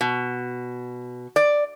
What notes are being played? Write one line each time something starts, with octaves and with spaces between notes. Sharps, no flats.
B2
D5